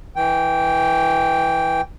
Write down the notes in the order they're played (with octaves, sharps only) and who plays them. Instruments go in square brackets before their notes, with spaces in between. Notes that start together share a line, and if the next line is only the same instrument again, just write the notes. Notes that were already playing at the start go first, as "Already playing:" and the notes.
[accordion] E3 G5